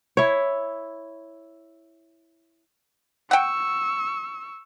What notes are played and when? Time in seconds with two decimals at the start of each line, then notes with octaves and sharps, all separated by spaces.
0.17 E4 C#5
3.31 F#5 G5 C#6 E6